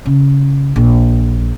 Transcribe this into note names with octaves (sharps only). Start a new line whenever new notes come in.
C#3
A#1